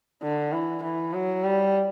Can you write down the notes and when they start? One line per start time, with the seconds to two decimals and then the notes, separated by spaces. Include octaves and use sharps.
0.23 D3
0.53 E3
0.82 E3
1.13 F#3
1.44 G3